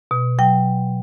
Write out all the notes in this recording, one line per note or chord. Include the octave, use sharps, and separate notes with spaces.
B2
F#3 G5